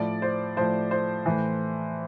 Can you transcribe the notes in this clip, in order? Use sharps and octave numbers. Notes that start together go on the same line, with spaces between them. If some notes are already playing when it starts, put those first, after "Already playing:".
Already playing: A2 F3 D5
C5
A2 F3 C5
C5
A2 E3